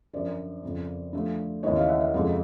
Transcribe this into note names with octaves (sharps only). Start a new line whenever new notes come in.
F#2 D3 F3 C5 D5
F2 C#3 F3
D3 F3 A3
D#2 C#3 E3 C#5 D#5
D#5 F5
E5 F#5
E5 F#5
F2 C#3 F3 G#3